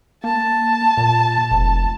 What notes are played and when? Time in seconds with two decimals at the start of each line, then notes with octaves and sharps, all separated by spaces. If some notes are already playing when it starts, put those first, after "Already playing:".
0.24 A#3 A5
0.97 A#2
1.51 F1